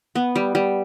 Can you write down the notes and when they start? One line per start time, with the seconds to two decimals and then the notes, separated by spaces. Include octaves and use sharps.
0.15 B3
0.36 G3
0.55 G3